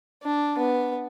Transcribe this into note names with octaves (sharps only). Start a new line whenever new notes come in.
D4
B3